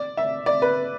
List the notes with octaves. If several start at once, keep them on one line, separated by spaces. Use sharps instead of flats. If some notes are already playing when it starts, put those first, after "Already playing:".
Already playing: D5
E5
D5
B4